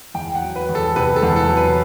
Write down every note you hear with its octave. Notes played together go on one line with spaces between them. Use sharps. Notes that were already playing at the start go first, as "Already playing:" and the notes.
E2 G5
F#5
F#3
B4
E2
A4
C3 B4
A4
E2
A4
F#3
B4